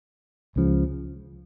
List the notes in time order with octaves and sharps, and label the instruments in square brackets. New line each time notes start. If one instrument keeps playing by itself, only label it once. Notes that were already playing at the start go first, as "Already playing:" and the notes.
[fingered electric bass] C#2 C#3 F3